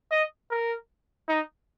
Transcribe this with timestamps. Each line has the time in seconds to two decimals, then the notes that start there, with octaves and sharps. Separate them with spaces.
0.11 D#5
0.50 A#4
1.28 D#4